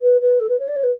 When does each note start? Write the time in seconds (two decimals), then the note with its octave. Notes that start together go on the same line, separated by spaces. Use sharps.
0.01 B4
0.21 B4
0.39 A4
0.48 B4
0.59 C#5
0.67 D5
0.75 C#5
0.83 B4